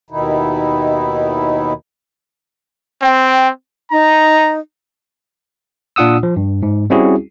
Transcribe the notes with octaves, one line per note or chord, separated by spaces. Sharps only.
D#2 B2 D#3 D#4 E4
C4 G5
D#4 A#5
A#2 D4 F4 F#5 D#6 E6
F3
G2
G#2
G3 C4 C#4 E4 F#4 G#4